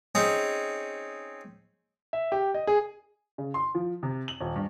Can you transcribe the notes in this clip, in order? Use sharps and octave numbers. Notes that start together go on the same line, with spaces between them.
C4 C#4 D#4 G#4
E5
G4
D#5
G#4
C#3
C6
F3
C3
F#7
D#1
G2